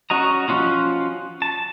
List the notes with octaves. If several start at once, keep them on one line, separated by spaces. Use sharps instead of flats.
C#4 F#4 D#5 A#5
F3 B3 C#4 F4 F#4
A5